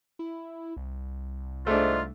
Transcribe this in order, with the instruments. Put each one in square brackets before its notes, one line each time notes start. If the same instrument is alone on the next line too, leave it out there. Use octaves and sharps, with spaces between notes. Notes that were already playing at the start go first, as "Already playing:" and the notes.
[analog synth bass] E4
C2
[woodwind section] G#2 [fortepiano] A3 D4 [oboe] F4